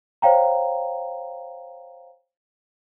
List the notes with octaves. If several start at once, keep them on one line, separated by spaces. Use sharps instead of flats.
C5 C#5 F5 G5 A#5